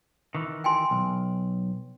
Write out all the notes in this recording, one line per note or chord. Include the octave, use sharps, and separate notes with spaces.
D#3 E3
G5 G#5 C6
B1